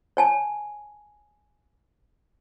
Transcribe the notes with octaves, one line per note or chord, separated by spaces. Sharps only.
C#5 G#5 A5